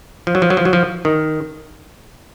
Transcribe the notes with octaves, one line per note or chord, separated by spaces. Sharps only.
F3
F#3
F3
F#3
F3
F#3
F3
D#3